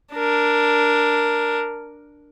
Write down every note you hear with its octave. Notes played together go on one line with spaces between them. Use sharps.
D4 A#4